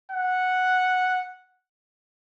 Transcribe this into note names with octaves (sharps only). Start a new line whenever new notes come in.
F#5